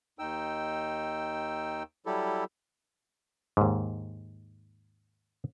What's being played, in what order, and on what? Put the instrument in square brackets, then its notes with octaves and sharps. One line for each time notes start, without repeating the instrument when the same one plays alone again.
[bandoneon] D#2 D#4 G5 E6
F#3 G3 E4 G4 A4
[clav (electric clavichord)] D#2 G#2